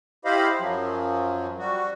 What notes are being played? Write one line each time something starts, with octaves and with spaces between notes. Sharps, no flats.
E4 G4 C5 D#5 F5 B5
F#2 F3 F#3
G3 F#4